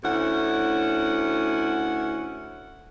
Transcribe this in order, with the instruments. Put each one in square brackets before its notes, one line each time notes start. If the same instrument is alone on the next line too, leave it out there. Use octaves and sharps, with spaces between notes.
[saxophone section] D2 C#4 E4 F#5